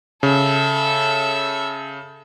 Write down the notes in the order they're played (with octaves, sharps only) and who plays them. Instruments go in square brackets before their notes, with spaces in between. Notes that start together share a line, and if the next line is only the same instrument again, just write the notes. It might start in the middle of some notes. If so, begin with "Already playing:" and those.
[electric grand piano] C#3 [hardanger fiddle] A4 E5